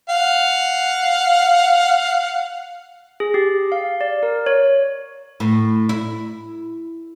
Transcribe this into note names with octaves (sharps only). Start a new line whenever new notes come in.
F5 F#5
G#4
G4
F5
D5
A#4
C#5
A2
E4